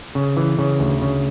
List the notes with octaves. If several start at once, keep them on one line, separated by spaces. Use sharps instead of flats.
C#3
E3
C#3
D2
C#3